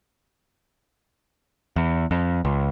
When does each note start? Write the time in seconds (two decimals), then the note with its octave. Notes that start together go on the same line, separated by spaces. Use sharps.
1.76 E2
2.11 F2
2.45 C#2